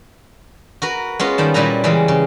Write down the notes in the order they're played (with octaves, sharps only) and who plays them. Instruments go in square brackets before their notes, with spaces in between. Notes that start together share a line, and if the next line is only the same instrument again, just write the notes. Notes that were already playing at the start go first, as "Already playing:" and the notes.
[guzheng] F#4 A#4 B4
G#3 B3 C#4 F4
D#3 G3 A5
A#2 G3 E4 B4 A#5
C#3 E3 G3 G#3
C#3